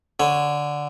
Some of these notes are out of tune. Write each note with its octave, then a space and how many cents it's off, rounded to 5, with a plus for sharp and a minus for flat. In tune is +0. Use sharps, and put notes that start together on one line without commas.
D3 +0 C#5 -10